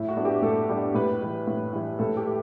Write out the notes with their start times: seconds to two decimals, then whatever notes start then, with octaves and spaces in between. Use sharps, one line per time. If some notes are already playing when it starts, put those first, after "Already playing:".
Already playing: A2 E4
0.08 F#4
0.16 G3 B3 D4
0.25 G4
0.42 A2 A4
0.69 G3 B3 D4
0.95 A2 B4
1.21 E3 G3
1.47 A2
1.73 E3 G3
1.99 A2 A4
2.17 G4
2.26 A3